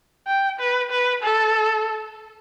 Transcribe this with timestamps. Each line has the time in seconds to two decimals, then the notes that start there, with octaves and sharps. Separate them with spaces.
0.27 G5
0.59 B4
0.91 B4
1.23 A4